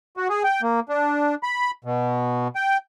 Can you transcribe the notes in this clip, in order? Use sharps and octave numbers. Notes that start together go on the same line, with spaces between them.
F#4
G#4
G5
A#3
D4
B5
B2
G5